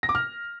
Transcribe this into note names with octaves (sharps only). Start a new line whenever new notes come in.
A#6
D6
F6